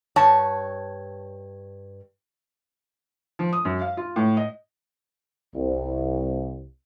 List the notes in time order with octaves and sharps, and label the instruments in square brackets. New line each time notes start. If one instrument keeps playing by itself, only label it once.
[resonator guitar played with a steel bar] G2 C#5 A5
[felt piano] F3
D#6
F#2
F5
F4
A2
D#5
[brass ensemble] C2